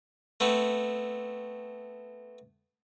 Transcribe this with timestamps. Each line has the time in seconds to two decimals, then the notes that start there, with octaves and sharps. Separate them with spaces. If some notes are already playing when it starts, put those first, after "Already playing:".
0.40 A3 B3 C4